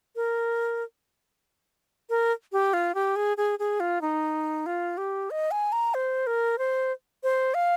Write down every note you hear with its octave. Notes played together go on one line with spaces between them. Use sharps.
A#4
A#4
G4
F4
G4
G#4
G#4
G#4
F4
D#4
F4
G4
D#5
G#5
A#5
C5
A#4
C5
C5
F5